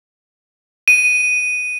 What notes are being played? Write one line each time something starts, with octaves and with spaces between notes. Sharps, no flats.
D#7